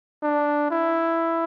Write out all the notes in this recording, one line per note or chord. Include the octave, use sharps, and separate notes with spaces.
D4
E4